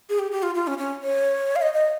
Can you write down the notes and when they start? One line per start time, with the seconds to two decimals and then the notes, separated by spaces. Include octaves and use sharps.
0.09 G#4
0.19 G4
0.31 G4
0.43 F4
0.55 F4
0.67 C#4
0.78 C#4
1.03 C#5
1.56 F5
1.62 D#5
1.74 D#5